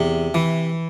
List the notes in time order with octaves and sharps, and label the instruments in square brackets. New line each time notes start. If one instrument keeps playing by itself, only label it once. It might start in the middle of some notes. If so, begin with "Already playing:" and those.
Already playing: [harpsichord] E2 C3
E3